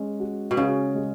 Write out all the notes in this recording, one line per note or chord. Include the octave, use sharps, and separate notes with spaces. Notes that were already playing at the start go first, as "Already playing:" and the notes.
Already playing: G#3 C#4
F#4
B2
C#3 C#4
G#3